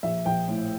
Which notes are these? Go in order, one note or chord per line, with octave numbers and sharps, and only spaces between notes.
A#1 E5
A#1 G5
A2